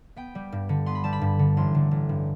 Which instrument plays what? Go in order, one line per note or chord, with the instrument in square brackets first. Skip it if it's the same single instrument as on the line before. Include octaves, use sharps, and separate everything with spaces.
[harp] B3 G5
G3
G2
D3
B3 C6
B5
G3 A5
B5
G2
D3
A1 C6
D3
A1
G2